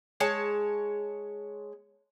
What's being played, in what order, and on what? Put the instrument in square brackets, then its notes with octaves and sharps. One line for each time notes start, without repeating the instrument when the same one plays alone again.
[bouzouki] G#3 C#5 A5